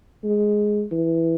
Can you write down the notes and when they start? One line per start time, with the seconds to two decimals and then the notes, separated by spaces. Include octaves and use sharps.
0.24 G#3
0.91 E3